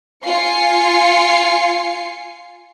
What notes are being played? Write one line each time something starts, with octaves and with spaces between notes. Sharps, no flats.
F4 F5 G#5 C7 C#7